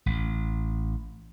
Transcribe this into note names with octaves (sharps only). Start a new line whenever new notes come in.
A1